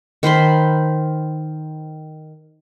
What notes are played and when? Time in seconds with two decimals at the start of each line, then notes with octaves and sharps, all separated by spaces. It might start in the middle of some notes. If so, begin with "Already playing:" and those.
0.23 D#3 C5 B5 C6